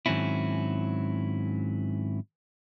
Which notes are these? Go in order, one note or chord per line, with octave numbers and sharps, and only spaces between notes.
G#2 D#3 F#3 C4 C#4 E4